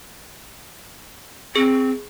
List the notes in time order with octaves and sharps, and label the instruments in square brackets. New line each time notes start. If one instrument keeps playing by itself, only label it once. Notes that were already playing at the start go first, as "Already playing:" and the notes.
[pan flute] C4 [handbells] G#4